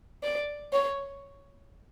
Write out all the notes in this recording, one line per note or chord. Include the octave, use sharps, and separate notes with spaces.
D5
C#5